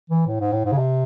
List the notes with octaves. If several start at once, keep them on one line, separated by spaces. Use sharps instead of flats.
E3
A2
G#2
A2
G#2
C#3
C3